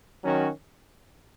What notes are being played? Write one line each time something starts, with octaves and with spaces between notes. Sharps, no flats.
D#3 F#3 C#4 F#4